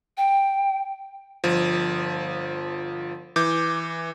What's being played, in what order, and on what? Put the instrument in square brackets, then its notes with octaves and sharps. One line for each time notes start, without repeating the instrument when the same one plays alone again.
[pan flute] G5
[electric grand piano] G1 F3
E3 D6 G6